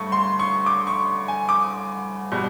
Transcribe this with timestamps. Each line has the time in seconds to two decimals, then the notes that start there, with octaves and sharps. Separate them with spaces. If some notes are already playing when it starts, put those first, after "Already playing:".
Already playing: G2 A3 C#6
0.12 C6
0.39 C#6
0.66 D6
0.87 C#6
1.28 G#5
1.49 D6
2.32 B2 G3